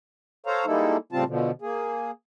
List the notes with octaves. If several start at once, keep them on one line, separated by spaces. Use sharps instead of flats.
A4 C5 C#5 F5 A#5
G3 G#3 A#3 D#4 E4 A4
A2 C#3 G3 C4 F4 A5
B2 D3 F3
A#3 G#4